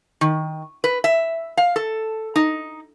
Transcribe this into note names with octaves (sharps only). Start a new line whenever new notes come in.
D#3
B4
E5
F5
A4
D#4